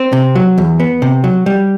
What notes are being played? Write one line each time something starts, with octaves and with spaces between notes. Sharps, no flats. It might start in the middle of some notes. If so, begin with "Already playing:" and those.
Already playing: C4
C3
F#3
E2
B3
C3
F#3
G3